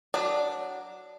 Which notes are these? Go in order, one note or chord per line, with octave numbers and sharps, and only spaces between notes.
F#3 D4 D5